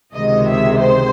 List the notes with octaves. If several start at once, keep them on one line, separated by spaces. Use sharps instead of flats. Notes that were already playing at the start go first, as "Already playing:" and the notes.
C#2 C3 D#3 G#3 D#5
E5
C5